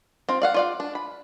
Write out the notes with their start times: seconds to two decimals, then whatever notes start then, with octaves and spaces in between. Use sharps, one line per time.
0.29 C4 F4
0.42 D5 F5 F#5
0.54 F4 D5 F5
0.80 D4
0.95 B5